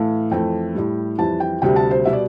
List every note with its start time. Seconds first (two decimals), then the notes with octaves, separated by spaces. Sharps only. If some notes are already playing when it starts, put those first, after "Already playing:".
Already playing: A2 E3 A3 F5
0.31 F2 E3 A3 G5
0.75 A2 G3
1.18 F2 E3 G3 A5
1.40 G5
1.62 D2 C3 G3 G5
1.76 A5
1.91 C5
2.05 B2 G3 E5
2.13 D5